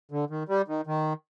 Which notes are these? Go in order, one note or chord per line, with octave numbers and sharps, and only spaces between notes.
D3
D#3
G3
D#3
D#3